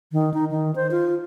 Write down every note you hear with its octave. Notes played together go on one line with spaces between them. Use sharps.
D#3
D#4
D#3
C5
F4